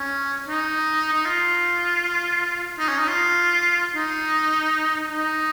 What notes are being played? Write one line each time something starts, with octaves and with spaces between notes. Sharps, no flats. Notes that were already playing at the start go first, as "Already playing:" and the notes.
Already playing: C#4
D#4
D#4
F4
D#4
C#4
D#4
F4
D#4
D#4